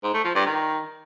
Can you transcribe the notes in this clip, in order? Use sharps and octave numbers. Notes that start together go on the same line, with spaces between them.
G#2
A3
F3
G2
D#3